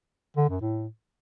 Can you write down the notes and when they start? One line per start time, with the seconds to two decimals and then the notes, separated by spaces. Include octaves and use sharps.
0.37 D3
0.49 F#2
0.61 A2